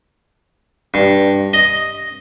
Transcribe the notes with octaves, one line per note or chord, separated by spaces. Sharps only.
G2
D#5